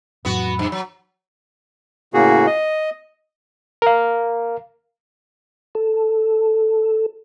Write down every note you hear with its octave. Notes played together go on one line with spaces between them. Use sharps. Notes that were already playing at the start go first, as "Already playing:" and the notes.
F2 A2 F#3 B3 F#4
G2
F#3
A2 C#3 A#3 F#4 G#4
D#5
A#4 F5
A4